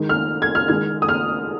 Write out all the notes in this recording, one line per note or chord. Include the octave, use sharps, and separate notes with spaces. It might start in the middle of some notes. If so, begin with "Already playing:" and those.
Already playing: D#3 G#3
F6
G#6
F6
D#3 G#3 G#6
D#6
F6